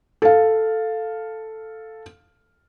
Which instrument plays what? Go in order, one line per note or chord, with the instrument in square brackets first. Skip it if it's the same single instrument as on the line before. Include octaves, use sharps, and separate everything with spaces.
[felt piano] A4 F5